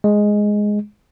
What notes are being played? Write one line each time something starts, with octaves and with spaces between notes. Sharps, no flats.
G#3